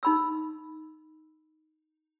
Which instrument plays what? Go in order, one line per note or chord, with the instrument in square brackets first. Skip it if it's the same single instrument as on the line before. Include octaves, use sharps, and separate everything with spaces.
[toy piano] D#4 B5 E6